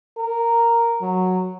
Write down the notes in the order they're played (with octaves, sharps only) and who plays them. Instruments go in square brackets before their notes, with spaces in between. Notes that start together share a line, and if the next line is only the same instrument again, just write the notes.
[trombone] A#4
F#3